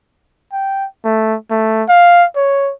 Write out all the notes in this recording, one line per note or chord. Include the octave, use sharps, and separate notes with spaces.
G5
A3
A3
F5
C#5